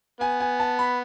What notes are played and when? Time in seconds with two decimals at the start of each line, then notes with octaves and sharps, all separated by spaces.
0.21 B3 G#5
0.40 G#5
0.60 A5
0.79 B5